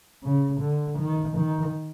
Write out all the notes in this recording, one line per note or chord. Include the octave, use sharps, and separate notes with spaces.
C#3
D3
D#3
D#3